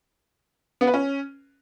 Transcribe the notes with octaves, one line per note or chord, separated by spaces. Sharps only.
B3
B4
C#4